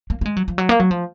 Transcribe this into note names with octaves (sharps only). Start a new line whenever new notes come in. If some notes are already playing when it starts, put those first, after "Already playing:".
A#3
A#3
G#3
F#3
F3
F#3
A#3
F#3
F3